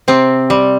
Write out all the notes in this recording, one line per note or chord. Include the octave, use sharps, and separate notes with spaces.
C3 C4
G3